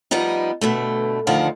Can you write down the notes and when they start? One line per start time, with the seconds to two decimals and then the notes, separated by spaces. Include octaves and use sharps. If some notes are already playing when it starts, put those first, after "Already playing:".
0.11 F3 G3 B3 D#4 D#5
0.61 G2 B2 D3 A3
1.27 D2 D3 D#3 F3 F5 F#5